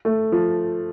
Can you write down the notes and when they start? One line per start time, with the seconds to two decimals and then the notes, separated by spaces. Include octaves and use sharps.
0.05 A3
0.32 F3